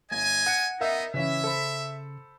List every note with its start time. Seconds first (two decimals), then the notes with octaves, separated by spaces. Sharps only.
0.11 G1 D#5 G#5
0.46 F#5 F#6 C#7
0.81 B3 D#4 A#4 D#5 E5
1.14 C#3 E3 C#4 E4 E5
1.44 A4 C5 B5